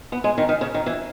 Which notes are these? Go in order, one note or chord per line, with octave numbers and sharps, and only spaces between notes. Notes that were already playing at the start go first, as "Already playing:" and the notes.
B3
G#3
D#3
D#3
C#3
D#3
E3